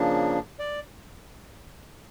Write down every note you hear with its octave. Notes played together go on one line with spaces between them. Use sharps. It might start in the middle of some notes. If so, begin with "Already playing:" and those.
Already playing: C#3 F3 A#3 D4
D5